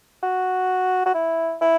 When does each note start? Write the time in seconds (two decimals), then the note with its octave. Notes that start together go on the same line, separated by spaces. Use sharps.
0.23 F#4
1.06 F#4
1.14 E4
1.61 E4